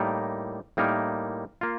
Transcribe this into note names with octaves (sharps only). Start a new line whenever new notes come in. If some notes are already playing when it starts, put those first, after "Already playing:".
Already playing: A2 G3 A#3 D#4 A#4
A2 G3 A#3 D#4 A#4
A#3 F4